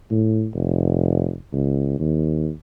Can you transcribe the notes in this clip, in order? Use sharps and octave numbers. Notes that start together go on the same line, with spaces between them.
A2
F1
C#2
D#2